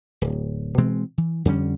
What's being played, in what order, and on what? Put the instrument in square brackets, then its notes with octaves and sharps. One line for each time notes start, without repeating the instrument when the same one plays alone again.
[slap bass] D1
B2 E3 G#3 C4
E3
F2 D3 G3 C#4